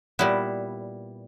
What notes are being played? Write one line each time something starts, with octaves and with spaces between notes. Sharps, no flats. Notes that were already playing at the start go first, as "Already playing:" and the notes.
A#2 G3 B3 E4